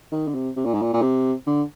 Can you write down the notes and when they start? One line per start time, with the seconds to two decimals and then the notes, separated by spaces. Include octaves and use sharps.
0.12 D#3
0.28 D3
0.34 C3
0.56 C3
0.65 A#2
0.74 G#2
0.82 A#2
0.93 A#2
1.02 C3
1.47 D3